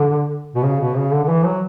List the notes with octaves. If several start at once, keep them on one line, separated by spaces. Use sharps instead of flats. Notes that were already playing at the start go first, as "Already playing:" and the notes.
Already playing: D3
B2
C#3
B2
C#3
D3
D3
E3
F#3